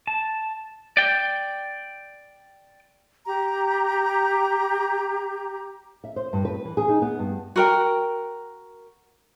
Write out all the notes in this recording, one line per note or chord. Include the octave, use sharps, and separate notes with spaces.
A5
D5 G5
G4 A#5
E5
C5
G2
B4
E3
G#4
D#4
B3
G2
F#4 A#4 G5